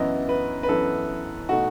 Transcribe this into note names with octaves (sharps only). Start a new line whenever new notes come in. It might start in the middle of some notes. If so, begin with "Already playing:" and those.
Already playing: F#2 E3 B3 E4 D#5
B4
B4
F#2 E3 B3 E4 A4
B2 A3 D#4 F#4